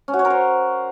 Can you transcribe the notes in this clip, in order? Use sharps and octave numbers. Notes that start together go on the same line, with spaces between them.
C#4
F#4
C#5
A#4
C5